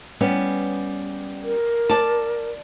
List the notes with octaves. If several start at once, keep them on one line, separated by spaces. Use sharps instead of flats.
G3 B3 C#4
A#4
D5 A5